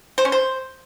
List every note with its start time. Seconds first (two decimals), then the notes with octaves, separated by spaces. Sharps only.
0.18 C5
0.25 C#4
0.32 C5